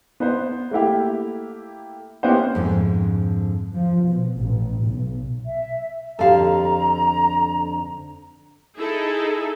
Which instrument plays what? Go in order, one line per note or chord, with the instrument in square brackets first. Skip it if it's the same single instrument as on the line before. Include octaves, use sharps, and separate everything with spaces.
[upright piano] B3 B4 C5
A3 A#3 E4 G4
A#3 B3 C#4 E4 G4 C5
[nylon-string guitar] F2 G#2 D3
[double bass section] F3
B2
A1
B1
[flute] E5
[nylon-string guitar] F2 D3 G4 [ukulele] A4 F5 [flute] A#5
[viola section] D#4 E4 G#4 A4